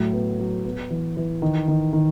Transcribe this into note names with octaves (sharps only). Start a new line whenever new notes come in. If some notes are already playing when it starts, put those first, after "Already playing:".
Already playing: A2 F#3
B3
F#3
B3
E3
E3
D#3
D#3
D#3